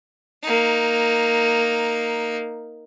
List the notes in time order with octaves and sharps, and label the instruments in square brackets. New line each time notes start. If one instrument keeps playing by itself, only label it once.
[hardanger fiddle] A#3 D#4